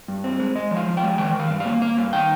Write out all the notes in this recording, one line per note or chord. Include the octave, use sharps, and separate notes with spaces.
G2
C4
G#3
G#3 D#5
F3
F5
F3
G5
G#3
D#3 G5
D#3
F5
G2
A#3 F5
A#3 F5
G2
D#3 G5